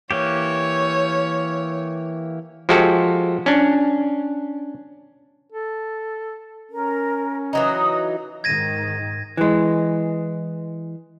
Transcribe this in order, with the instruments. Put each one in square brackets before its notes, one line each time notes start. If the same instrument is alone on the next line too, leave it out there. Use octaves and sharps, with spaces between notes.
[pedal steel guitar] E3 A#3 G4 [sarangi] C#5
[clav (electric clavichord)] F3 G#3 F#4 G4 A4
C#4 D4
[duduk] A4
[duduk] C#4 [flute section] A#4
[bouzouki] E3 F#3 D#4 [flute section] D#6
[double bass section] G#2 D#3 [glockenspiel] G#6 A#6 D#7
[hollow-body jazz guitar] E3 G#3